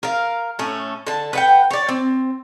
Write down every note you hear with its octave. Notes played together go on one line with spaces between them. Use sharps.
A#4 F5
A2 A3 C#4
D3 A5
B4 F#5 G5
C#5 D5
C4